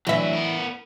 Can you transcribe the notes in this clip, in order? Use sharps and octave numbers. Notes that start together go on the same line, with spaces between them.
D2 E3 F#3 E5
B3 A#4